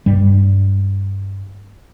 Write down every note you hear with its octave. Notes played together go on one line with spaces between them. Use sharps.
G2 G3